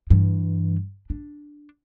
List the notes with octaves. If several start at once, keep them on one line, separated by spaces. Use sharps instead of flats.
G2 E3
D4